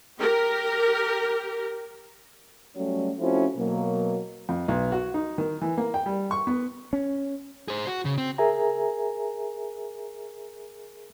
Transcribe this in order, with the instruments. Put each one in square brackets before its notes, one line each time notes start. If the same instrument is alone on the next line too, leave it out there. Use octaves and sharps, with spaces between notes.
[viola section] G4 A#4
[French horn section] F#3 G3 A3 C#4
F3 A3 C4 C#4 E4 F#4
B2 F#3 A#3
[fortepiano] F2
B1
F#4
D#4
D#3
E3
A#3
G5
G3
C#6
B3
[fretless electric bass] C#4
[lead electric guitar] G#4 C5
F#4
C#3
C4
[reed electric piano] G#4 A#4 E5 G#5 A#5